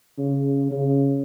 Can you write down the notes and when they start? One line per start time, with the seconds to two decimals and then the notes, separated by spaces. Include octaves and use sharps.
0.18 C#3
0.71 C#3